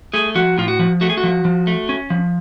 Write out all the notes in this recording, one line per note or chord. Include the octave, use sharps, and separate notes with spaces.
A3 G#4
F3 F#4
A2 F4
F#4
F3
A3 F#4
G#4
F#4
F3
F3
A3
C#4
F3